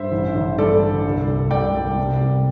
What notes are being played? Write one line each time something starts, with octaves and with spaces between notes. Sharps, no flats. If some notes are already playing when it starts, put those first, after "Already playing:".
Already playing: G2 C5 E5
A1
A1
G2 A4 D5
D3
C2
C2
C2 D5 G5
C2
C3
C2